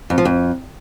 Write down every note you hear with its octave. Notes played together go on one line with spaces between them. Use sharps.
F2
F3
F2